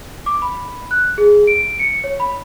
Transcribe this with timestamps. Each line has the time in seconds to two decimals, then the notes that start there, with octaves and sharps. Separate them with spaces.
0.26 D6
0.42 B5
0.91 F#6
1.18 G#4
1.47 D7
1.79 C#7
2.04 C#5
2.20 B5